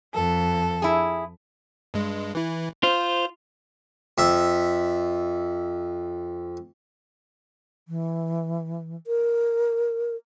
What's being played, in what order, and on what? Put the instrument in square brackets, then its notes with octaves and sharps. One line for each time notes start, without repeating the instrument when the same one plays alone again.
[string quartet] F2 A4
[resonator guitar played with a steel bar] E4 G#4
[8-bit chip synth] G2 G#3
E3 E4
[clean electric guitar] F4 [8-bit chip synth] C5
[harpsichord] F2 E5
[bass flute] E3
A#4